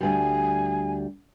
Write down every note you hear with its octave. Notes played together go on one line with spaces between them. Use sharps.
D2 G3 G#5